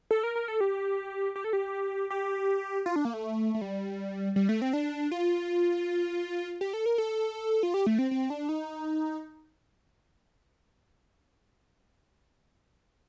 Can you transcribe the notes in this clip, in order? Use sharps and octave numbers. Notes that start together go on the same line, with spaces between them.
A4
A#4
A#4
A4
G4
G4
A4
G4
G4
F4
D4
A#3
A3
A3
G3
G3
A3
C4
D4
F4
G4
A4
A#4
A4
F4
G4
A3
C4
C4
D4
D#4